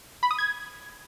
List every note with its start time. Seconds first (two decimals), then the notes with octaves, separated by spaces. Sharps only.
0.23 B5
0.31 D#6
0.38 G#6